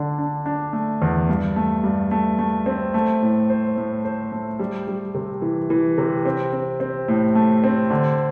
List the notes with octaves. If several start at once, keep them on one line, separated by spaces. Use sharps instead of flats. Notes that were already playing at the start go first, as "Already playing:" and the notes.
Already playing: D3 D4
D4
D4
A3
E2
G2
A3
G2
A3
A3
C4
A3
A2
C5
A2
C5
A3
G3
G3
C3
E3
E3
C3
C4
C4
C4
A2
A3
C4
D3